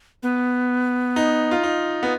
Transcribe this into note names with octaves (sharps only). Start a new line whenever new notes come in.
B3
D#4
F4
D#4
B3